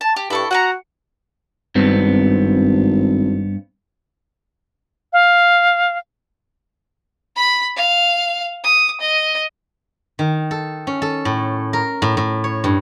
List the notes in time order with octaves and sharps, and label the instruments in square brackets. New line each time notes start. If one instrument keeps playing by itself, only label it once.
[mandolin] A5
G4
[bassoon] G2 [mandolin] E4 A4 C#6
[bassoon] F#4 [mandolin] F#5 G5 A#5
[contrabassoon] G#1 [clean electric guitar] G2 B3 C4
[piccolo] F5
[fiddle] B5
F5
D#6
D#5
[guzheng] D#3
A4
C#4
A4
A2
A#4
A2
A2
C#5
G2